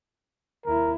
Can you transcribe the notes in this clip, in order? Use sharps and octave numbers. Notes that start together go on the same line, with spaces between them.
D#2 E4 A#4